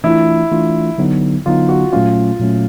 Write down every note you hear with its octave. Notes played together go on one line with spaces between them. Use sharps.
E3 A3 D4 E4 F4
E3 A3 D4 F4
D3 F#3 B3 D#4
D3 F#3 B3 D#4 F4
F#4
A#2 F#3 A3 C#4 F4
A#2 F#3 A3 C#4